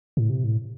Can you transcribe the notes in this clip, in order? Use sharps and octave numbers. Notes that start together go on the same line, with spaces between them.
A2
C3
A2